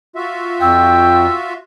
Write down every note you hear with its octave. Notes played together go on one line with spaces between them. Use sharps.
F4 F#4 E5
F2 G5 E6